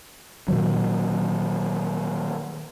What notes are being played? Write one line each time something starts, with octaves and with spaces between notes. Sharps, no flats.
A#2 D#3 F#3